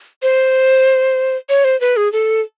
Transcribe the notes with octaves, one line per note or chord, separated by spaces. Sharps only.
C5
C#5
C5
B4
G#4
A4